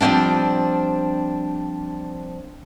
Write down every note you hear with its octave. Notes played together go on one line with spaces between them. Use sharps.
F3 G3 A#3 C4 D4